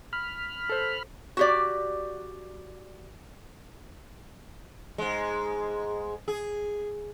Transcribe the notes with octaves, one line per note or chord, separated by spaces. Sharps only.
B5 F6
A4 C5
F#4 G4 D5
G#2 G#3
G#4